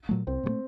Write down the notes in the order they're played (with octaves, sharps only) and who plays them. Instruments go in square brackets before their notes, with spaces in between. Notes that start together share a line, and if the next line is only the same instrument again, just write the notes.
[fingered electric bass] A#2 F#3 A3
[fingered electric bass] C2 [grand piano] C4
[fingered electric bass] A#2 F#3
A3